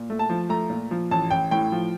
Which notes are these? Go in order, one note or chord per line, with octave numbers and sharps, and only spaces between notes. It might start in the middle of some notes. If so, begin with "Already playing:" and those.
Already playing: A#2
A3
A5
F3
A3 A#5
A#2
F3
A1 A5
A1 G5
A2 G5
F3